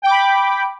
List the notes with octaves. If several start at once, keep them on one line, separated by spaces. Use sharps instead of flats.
G5 B5 D6